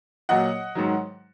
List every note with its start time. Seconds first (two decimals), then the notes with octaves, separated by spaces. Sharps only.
0.29 A#2 F#3 D#5 F#5
0.75 G#2 D#3 F#3